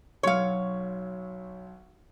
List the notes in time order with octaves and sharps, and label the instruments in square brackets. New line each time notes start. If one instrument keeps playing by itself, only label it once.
[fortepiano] B1 F#3 C6 [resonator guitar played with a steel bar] C#5 F5